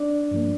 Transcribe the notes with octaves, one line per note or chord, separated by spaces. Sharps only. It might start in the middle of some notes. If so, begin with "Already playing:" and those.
Already playing: D4 D5
G2 F3 A#3